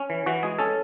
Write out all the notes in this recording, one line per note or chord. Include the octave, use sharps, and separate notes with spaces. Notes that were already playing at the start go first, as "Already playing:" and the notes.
Already playing: C#4
E3
E3 F#4
G#3 G#4
C#4 A4